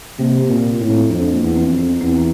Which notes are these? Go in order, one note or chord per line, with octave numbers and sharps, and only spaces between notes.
C3 A#3
C4
A#2
A#3
A2
C4
F2 D4
A#3
E2
C4
F2
C4
E2 C4